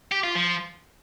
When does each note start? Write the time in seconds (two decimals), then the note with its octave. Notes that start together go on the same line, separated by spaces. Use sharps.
0.12 G4
0.24 F4
0.36 F3